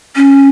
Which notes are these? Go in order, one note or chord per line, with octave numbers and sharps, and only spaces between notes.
C#4